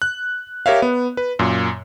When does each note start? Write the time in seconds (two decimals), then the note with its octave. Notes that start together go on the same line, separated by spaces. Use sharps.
0.02 F#6
0.66 G4 A#4 C#5 E5 F5
0.82 B3
1.17 B4
1.39 F#2 A#2